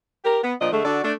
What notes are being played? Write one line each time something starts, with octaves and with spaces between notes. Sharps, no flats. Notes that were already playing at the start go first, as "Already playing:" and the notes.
G4 A#4
B3
A#2 F3 D4 D#5
D3 G#3 A3
D3 D4 F#4 A4 D5
A3 D4